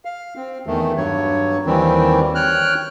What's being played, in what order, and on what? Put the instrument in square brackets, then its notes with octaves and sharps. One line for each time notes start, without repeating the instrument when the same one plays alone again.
[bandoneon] F5
C4
E2 D#3 A3
G2 F#3 C#5
D#2 D#3 E3 G3 C4
C#5 G5 F6 F#6